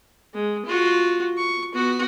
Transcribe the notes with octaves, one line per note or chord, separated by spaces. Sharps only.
G#3
F4 F#4
C#6
B3 F#4